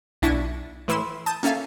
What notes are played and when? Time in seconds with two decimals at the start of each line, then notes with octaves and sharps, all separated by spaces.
0.22 B1 D4 E4 C#6 A#6 D#7
0.88 A2 E3 E4 C6 E6
1.26 A5 D#6 G6
1.43 A#3 C#4 A4 E5 F5